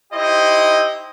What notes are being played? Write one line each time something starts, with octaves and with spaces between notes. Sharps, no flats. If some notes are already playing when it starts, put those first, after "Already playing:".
D#4 E4 G4 C5 D#5